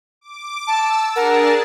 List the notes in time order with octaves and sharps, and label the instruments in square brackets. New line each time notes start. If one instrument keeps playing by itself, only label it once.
[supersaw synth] D6
[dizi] A5 [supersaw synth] E6
[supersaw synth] D4 G#4 A5 [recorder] A#4 [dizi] F#5